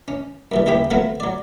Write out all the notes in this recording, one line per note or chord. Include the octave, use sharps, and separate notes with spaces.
C#4
F#2 E3 G3
D#2 C#3 E3 G4 G5 B5
F3 F#3 A3 B3 C4 F4
F#3 D5